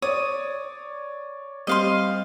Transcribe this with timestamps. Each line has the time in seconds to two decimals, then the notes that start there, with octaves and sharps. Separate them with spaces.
0.02 C#5 D5 D#6
1.67 G3 C4 D#5 F5 C6